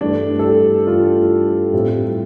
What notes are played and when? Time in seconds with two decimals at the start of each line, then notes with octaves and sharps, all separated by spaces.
0.01 G2 E3 A3 D4
0.39 A4
0.44 G4
0.87 G2 E3 A3 F4
1.73 A2 G3 C4